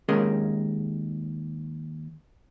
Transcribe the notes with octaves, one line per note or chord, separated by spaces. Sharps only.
D#2 G#3 C#4 G#4 A#4 D#5